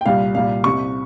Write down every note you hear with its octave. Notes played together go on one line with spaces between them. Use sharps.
G5
C2 A#2 G3 F5
C2 A#2 G3 F5
C2 C3 G3 C#6